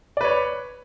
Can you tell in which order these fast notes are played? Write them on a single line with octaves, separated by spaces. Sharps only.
D5 B4 C#5 B5